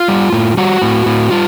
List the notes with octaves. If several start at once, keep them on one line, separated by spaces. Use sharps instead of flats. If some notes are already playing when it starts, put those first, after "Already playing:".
Already playing: F4
G3
A2
G3 F#4
A2
A2
G3 F4